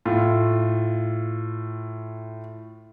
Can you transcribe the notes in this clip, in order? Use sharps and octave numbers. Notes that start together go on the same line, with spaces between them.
A2 F4